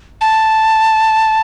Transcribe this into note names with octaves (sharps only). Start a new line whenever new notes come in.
A5